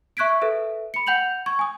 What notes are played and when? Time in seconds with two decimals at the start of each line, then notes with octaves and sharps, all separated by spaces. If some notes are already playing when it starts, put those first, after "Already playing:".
0.17 E5 C#6 F#6 G#6 B6 D7
0.42 A4 B4 E5
0.94 B5 C#7
1.07 F#5 G5 G6 F7 F#7
1.46 C#6 G#6
1.59 G#5 D#6